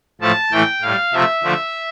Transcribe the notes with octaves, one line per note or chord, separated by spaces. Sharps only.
A2 F3 A3 A5
A2 E3 A3 G5
A2 G3 F5
C3 F3 A3 E5
D3 F3 A3